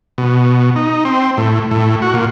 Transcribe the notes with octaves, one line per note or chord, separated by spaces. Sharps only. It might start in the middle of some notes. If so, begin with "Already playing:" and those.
B2
D#4
C4
A2
A2
F#4
A#2